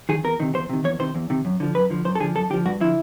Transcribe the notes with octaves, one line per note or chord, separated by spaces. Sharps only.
D#3 G#4
E2 A#4
C3 D#3
E2 C5
C3 D#3
E2 C#5
C3 D#3 C5
E2
C3 D#3
F#2
D3 F3
F#2 B4
D3 F3
F#2 C5
A4
D3 F3 G#4
F#2 A4
D3 F3 G4
G2 F#4
D3 F3 E4